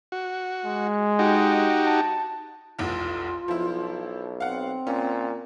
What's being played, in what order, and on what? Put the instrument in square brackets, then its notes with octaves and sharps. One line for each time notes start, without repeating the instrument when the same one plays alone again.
[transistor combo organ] F#4
[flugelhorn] G#3
[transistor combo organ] D#4 F#4 G4
[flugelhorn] A5
[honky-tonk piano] F1 B1 E2 [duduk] F4
[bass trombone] B1 [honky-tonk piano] F3 E4
[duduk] C4 [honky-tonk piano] F5 F#5
[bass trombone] A#2 [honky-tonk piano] C#4